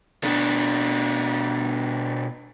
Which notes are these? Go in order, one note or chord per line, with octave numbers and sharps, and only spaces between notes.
B2 D4